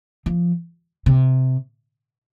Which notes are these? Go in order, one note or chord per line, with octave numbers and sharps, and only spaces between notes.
F3
C3